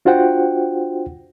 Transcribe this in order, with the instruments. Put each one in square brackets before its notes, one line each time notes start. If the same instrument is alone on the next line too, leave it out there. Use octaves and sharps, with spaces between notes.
[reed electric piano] D4 F4 F#4 C5 F#5 G5